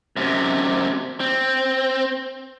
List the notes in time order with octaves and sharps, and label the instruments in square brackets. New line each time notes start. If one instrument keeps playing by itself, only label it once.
[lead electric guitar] F#2 C3
C4